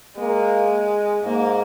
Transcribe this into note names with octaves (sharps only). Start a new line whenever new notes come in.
G#3 A#3
G#2 A#3